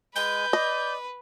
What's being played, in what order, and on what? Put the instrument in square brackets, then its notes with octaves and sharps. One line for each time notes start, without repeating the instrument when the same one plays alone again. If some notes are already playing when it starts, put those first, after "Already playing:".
[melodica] G#3 G#5 [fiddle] B4 [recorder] G6
[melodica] D5 [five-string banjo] D#5